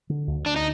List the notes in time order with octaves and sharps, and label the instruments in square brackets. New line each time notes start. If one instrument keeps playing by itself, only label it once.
[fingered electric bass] D3
D2
[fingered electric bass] D2 [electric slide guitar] D4
[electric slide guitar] D#4